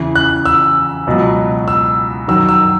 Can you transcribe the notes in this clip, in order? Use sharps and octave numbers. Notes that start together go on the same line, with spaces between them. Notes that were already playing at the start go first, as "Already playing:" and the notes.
Already playing: E2 C#3 E3
F#6
E6
C#2 B2 F#3
E6
F#2 D#3 F#3 E6
E6